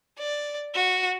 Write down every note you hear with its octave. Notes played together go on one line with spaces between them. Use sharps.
D5
F#4